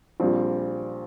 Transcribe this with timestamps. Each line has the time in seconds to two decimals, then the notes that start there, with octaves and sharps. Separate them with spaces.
0.20 A#1 A#2 G3 C4 F4